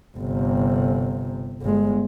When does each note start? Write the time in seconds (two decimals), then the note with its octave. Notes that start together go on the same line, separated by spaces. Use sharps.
0.17 G1 C3
1.62 G1 G#3